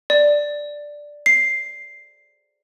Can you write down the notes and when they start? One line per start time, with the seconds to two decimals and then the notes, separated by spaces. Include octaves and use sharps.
0.10 D5
1.26 C7